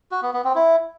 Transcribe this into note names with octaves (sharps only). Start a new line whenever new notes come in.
F#4
B3
B3
C4
E4